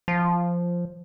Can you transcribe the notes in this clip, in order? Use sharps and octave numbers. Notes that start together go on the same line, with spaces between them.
F3